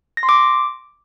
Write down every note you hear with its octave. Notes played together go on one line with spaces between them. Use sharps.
A#6
C6
D6